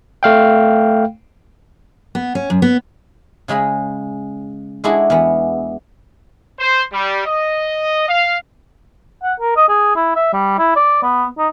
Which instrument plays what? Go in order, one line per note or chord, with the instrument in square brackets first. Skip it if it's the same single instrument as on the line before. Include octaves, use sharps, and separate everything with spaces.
[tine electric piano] A3 F5 G5
[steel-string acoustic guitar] B3
C#4
F#2
B3
[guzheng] C#3 G#3 G#4 B5
G#3 D4 E4 F#4 G#4 A4
E2 B3
[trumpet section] C5
G3
D#5
F5
[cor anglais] F#5
A#4
D#5
G#4
E4
E5
G3
E4
D5
B3
D#4